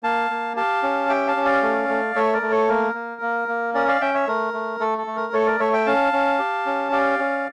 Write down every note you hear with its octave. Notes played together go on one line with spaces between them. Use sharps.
A#3 F5 A5
A#3
G4 F5 A5
C#4
G4 E5 G5
F5 A5
C#4
D5 F5
A3
A3
A3 C#5 E5
A#4 D5
A3
A4 C#5
A#3 A#4
A#3
A#3
A#3
C#4 A#4 D5
D5 F5
C#4 E5 G5
C#5 E5
A3 A#4
A3
A3 A4
A4
A3
A#4
A3 A4 C#5
A#4 D5
A3 C#5 E5
E5 G5
C#4 F5 A5
C#4
G4
C#4
G4 D5 F5
C#4